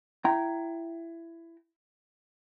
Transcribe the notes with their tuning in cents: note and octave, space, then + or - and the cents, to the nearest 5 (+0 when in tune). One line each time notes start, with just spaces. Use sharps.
E4 +15 G5 -15 A#5 +0